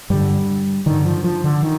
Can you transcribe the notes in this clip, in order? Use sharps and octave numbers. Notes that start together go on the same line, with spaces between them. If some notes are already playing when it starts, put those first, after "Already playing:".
G2 D3 G3
G2 D3 D#3
F3
F3
D3
D#3